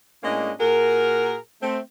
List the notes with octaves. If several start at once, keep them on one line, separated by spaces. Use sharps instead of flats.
A2 G#3 A#3 C#4 D4 D#5
A#2 F#4 G#4 A#4
A3 C4